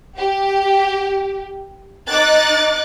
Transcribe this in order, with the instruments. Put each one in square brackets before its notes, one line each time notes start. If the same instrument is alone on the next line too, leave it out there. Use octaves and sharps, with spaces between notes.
[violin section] G4
D#4 D6 F#6 A6